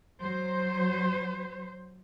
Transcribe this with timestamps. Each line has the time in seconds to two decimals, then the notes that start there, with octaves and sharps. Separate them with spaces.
0.22 F#3 C5